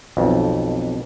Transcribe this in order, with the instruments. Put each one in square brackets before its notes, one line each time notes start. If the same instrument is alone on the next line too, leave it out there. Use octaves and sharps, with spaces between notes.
[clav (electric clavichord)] B1 F2